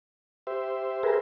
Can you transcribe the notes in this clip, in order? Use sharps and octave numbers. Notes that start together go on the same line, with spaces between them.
G4 C5 E5
G#4 A#4 B4